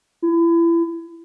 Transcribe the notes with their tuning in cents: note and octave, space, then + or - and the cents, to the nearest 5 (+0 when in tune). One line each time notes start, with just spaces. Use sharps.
E4 +30